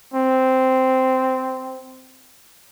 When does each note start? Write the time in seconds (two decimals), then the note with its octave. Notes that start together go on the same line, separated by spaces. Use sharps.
0.14 C4